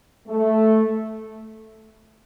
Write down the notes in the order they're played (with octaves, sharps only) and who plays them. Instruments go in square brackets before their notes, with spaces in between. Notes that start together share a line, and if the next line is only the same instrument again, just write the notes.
[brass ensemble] A3